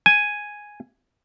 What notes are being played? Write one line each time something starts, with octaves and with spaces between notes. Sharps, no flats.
G#5